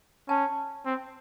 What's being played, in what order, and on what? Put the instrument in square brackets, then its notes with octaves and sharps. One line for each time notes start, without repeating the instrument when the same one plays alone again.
[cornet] C#4 [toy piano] A5
[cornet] C4